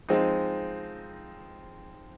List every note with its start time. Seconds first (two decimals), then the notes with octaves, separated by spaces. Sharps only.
0.09 F3 G#3 C4 D#4